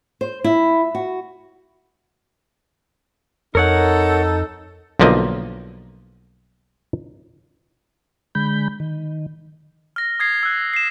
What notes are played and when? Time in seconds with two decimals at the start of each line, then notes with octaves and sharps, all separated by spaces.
0.21 C5
0.44 E4
0.95 F#4
3.55 F2 D#4 A4 A#4 C#5 F#5
5.00 B1 D3 F3 A#3 D#5
8.35 D3 G#3 B5 G6
8.80 D#3
9.96 F6 A#6
10.19 D#6 G#6 C7
10.43 E6 F#6
10.74 C7 E7